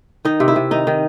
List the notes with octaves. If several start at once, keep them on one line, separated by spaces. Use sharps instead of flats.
D#3 D#4
C3
E4
C3
D#3 D#4
D#3